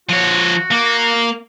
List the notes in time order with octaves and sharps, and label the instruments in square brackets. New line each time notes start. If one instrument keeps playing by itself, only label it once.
[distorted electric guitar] F3 C#5 [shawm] F#4
[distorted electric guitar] A#3